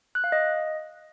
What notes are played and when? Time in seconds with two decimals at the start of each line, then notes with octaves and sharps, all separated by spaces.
0.15 F#6
0.24 F5
0.32 D#5